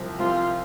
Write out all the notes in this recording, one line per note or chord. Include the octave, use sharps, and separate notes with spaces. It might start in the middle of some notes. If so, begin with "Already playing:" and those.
Already playing: C2 C3 F3 C4
C2 C3 F3 C4 F4